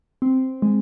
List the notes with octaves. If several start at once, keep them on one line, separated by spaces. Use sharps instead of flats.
C4
G#3